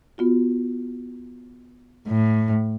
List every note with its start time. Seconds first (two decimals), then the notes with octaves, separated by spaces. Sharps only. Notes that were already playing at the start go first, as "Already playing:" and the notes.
0.18 B3 F4 F#4
2.08 A2